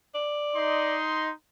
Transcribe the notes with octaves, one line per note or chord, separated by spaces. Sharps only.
D5
D#4 D#5 C6